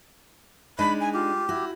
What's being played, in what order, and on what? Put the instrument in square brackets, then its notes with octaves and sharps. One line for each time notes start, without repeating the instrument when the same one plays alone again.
[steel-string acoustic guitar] G#3 D4 D#4 [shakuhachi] B5
[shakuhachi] G#5
[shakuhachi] F4 [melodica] G4
[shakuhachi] E4 [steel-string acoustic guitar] F#4